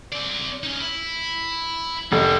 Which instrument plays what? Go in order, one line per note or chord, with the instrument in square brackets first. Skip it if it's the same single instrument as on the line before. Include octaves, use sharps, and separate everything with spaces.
[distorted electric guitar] C4 D5
C#4 D#4
E4
[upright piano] F1 [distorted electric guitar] D#3 F4